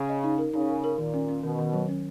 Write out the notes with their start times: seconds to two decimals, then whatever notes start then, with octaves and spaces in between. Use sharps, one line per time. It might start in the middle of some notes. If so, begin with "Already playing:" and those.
Already playing: C#3
0.09 D#5
0.24 D#4
0.38 A#4
0.53 C#3 D#4
0.68 A#4
0.84 A#4
0.98 A#2 D#3
1.14 C#4
1.29 C#4
1.43 B2 D#3
1.58 D#3
1.73 F#3
1.89 C#4